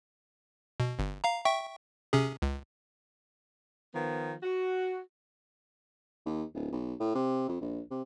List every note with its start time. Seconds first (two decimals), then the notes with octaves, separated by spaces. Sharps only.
0.80 B2
0.99 G1
1.24 F5 A#5
1.45 E5 G5 C#6
2.13 C3 C#4 G#4
2.42 C#2
3.94 D#3 F3 B3
4.43 F#4
6.26 D#2
6.55 D1
6.72 B1
7.00 A2
7.15 C3
7.49 F2
7.61 A#1
7.91 C3